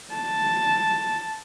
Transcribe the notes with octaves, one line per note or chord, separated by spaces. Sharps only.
A5